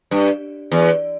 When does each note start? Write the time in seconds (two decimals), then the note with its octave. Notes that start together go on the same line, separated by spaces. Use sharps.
0.11 G2
0.72 E2